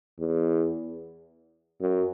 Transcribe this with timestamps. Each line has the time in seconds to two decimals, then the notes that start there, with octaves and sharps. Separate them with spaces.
0.20 E2
1.81 F#2